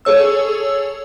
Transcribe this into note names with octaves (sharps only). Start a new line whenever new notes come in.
G#4 A4 C#5 E6